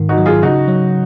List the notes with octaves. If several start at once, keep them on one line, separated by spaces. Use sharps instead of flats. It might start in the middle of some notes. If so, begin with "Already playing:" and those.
Already playing: G#2 D#3
D#4 F#4
F#3
F4 G#4
C#3 D#4 F#4
F#3